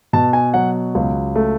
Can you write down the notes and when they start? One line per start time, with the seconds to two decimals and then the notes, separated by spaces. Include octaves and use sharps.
0.13 B2 A5
0.33 G#5
0.54 F#3 F#5
0.95 C#2
1.36 A3